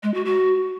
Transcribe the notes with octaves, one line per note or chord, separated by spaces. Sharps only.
G#3
F#4
F#4